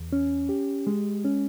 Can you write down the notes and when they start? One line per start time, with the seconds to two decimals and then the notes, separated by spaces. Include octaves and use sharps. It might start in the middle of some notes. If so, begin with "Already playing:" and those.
Already playing: E2
0.13 C#4
0.49 G4
0.87 G#3
1.24 C#4